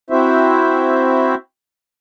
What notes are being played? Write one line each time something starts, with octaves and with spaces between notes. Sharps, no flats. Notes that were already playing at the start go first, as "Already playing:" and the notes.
C4 E4 F#4 C5 E5